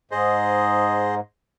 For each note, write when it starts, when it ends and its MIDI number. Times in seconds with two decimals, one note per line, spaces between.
0.11 1.20 44
0.11 1.15 68
0.11 1.15 72
0.11 1.15 75